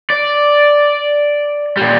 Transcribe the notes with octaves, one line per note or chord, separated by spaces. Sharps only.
D5
A#2 G3